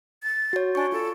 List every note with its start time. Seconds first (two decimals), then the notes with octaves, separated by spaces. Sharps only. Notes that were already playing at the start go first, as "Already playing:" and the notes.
0.23 A6
0.53 F#4 C#5
0.75 D4 G#5 C#6
0.92 F4 A4